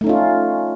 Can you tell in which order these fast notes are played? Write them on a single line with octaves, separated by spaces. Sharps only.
A3 D#4 C#4 F4